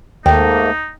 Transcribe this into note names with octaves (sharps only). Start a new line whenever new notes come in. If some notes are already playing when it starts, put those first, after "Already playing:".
D#2 G#2 A3 A#3 D#4 G5